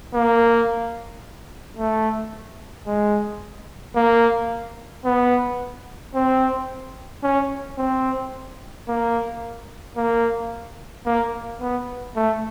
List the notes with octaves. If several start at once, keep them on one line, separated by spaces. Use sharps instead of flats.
A#3
A3
G#3
A#3
B3
C4
C#4
C4
A#3
A#3
A#3
B3
A3